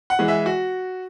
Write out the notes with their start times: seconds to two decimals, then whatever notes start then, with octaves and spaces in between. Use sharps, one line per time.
0.10 F#5
0.19 E3 G#3
0.28 E5
0.46 F#4